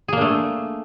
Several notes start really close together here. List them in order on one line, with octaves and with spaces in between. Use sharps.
G#4 A#3 D4 A3